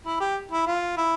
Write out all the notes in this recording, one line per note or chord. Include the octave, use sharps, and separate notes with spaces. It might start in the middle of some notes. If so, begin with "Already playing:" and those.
E4
G4
E4
F4
E4